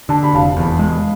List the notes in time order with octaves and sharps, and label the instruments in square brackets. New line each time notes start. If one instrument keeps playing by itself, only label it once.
[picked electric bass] D3 [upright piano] A5
[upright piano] B5
[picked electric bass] F1 [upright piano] F5 A5
[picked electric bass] E2
G#3